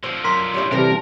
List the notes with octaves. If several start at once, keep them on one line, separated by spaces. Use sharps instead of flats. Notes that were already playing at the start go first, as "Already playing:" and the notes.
D3 F3 C4
F#2 A#4 C6 B6
G3 C#4 E4
C3 E3 G3 D4 G4 A4 A#4